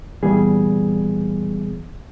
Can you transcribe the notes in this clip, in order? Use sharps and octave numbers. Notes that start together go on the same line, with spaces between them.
A#2 E3 G3 B3 G#4